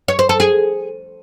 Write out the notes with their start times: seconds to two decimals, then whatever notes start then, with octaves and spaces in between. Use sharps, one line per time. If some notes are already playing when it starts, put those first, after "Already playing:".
0.08 C#5
0.19 C5
0.29 A4
0.40 G#4